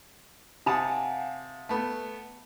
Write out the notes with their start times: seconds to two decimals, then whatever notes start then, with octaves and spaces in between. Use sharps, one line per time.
0.66 C3 F5 F#5 G#5 A5 D#6
1.69 A3 B3